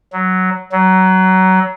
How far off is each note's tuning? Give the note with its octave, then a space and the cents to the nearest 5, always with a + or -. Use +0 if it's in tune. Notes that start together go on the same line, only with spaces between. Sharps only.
F#3 +5
F#3 +20